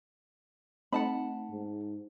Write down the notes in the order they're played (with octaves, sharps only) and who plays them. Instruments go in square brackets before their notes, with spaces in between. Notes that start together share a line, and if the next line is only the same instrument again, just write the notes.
[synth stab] A3 C4 D#4 [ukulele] F#5 A5 B5
[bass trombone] G#2